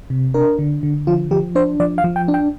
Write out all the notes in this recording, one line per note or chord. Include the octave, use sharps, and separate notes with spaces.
C3
D4 A#4
D3
D3
F3 F4
F3 G4
D4 C5
F3 D5
F5
F3
G5
D4
G5